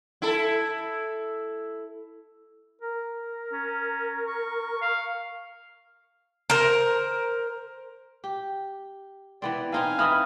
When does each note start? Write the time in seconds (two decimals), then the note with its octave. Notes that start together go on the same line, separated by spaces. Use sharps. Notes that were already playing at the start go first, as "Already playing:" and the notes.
0.22 E4 A4
2.81 A#4
3.53 C#4
4.27 C#6
4.82 F5
6.50 A#4 C5
8.24 G4
9.42 E3 B3 C4 D5
9.72 C4 D#4 E4 F5 G#5
9.99 E3 D#4 E4 B5 D#6 F6